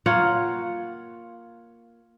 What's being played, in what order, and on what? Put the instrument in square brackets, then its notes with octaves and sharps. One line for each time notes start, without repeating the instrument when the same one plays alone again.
[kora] A#3 F4 C#5 F#5